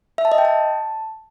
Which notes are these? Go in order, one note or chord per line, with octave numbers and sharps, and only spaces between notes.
E5
A5
D#5
G5
A5